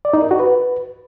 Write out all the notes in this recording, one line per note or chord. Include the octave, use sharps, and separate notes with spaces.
D5
D#4
A#4
F#4
B4